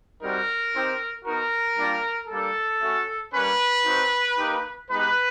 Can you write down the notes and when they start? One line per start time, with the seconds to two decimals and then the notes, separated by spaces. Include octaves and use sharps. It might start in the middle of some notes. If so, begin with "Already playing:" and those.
0.21 G3 C4 D#4 F#4 A#4
0.73 C4 D#4 G4
1.25 B3 D#4 F#4 A#4
1.77 G3 A#3 D4 F4
2.29 G3 A#3 D4 A4
2.81 A3 C#4 F#4
3.33 G3 A#3 C#4 B4
3.85 C4 D#4 F#4
4.38 A#3 D#4 G4
4.89 G#3 B3 D#4 G4 B4